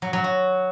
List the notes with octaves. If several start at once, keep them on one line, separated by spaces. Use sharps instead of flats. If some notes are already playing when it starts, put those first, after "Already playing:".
F#3
F#3
F#4